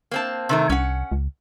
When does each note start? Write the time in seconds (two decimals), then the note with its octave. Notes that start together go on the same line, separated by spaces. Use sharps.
0.11 A#3 C4 A5
0.49 C3 D#3 A3
0.70 C2 C#4 F#5
1.12 C#2